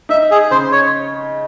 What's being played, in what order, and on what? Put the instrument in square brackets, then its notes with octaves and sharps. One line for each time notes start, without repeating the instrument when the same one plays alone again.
[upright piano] D#4 [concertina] E5
[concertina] G#4
[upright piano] C#3 [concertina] C5
[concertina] C#5